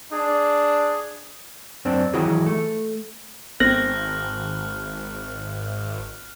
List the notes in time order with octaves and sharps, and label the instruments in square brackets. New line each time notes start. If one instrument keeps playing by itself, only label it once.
[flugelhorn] D4 [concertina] G#4
[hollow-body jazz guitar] F#2 C4 D4
D#3 E3 F#3 E4 F#4 G#4
A3
[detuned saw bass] G#1 [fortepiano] C4 [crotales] F6 F#6 F#7 [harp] A#6